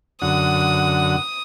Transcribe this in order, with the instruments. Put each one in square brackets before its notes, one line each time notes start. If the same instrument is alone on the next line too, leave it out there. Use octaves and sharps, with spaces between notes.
[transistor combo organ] F#2 D3 F#5 [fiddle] D#6